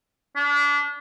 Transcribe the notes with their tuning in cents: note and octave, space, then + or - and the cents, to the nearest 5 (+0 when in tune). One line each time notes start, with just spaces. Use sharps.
D4 -30